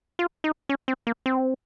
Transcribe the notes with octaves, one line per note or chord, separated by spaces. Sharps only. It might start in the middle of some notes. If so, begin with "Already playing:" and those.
F4
D#4
C#4
C4
A#3
C4